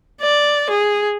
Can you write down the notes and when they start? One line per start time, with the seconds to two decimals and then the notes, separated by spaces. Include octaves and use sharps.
0.21 D5
0.70 G#4